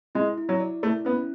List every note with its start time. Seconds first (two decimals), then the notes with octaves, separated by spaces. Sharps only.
0.15 G#3 E4
0.38 E4
0.49 F#3
0.60 D5
0.83 A3 E4
1.05 B3 C#4